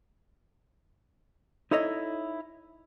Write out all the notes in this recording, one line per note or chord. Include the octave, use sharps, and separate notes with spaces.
D#4 E4 A4 C#5 D#5